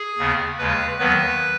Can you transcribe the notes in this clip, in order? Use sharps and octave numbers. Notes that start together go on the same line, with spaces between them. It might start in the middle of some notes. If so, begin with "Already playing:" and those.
Already playing: G#4
D#2 C#3 B3
D#2 C#3 G#3 B4
D#2 D#3 F#3 B3 B4